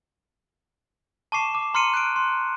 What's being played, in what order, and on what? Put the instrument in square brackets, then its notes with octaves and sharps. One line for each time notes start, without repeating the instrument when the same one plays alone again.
[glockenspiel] A5 C#6 D6 C7 E7
D6
A#5 C6 F6 C7 C#7 D#7
F#6 C#7 D7
C6